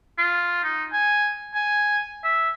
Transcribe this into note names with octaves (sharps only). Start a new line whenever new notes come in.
F4
D#4
G#5
G#5
E5